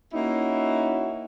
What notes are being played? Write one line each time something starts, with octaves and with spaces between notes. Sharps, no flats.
A#3 C#4 D#4 E4 F#4